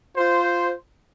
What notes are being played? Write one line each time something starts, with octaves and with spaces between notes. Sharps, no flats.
F4 C5